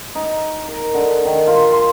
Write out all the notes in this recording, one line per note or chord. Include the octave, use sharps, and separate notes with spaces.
D#4
A#4
D3
D#3
F4
C6